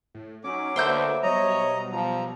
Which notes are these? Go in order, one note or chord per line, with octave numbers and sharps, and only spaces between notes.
A2
F#3 C#4 D#4 D6
D2 A#3 B4 C5 E5 G6
B2 F#3 G3 C#5 D#5 A#5
F3 A#5